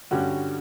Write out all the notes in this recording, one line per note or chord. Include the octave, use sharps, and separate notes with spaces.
G2 D3 G3 C#4 F#4